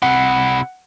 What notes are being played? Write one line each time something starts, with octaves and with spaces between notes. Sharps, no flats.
C3 E4 F#5